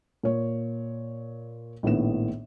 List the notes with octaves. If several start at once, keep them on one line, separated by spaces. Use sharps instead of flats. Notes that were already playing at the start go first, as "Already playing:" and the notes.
A#2 C#5
A#1 A2 D#3 B3 E7